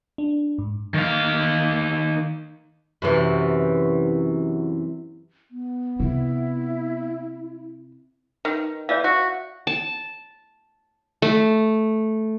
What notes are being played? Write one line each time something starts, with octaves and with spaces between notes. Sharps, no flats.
D4
G#2
D#3 F5
F#2 C3 E3
B3
C3 E4
D#3 B4
E3 D5 E5 F5
F#4
A5
A3